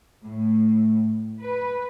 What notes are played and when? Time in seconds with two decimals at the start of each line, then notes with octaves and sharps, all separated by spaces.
0.24 A2
1.39 B4